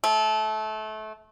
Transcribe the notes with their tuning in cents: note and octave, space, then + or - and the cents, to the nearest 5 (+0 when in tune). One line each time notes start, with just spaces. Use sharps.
A3 -25